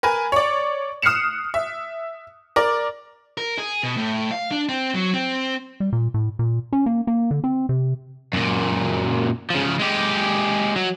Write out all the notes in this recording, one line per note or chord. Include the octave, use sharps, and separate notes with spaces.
A#4 B4 G#5
C#5 D5
D#6 F6 F#6 C7 C#7 E7
E5
A#4 D5
A#4
G#4
B2
A2
F5
D4
C4
F#3
C4
G3
A#2
A2
A#2
C#4
A#3
A#3
D3
C4
C3
F#2 A#2
C#3 F3
G#3 G4
F#3